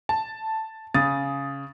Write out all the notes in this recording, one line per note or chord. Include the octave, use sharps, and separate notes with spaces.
A5
C#3 D#6 A6